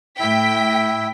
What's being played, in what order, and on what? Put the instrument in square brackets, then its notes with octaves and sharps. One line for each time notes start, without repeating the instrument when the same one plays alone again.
[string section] A2 G5 B6 [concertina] E4